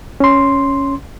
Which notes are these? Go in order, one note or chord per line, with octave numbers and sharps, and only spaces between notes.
C#4 C6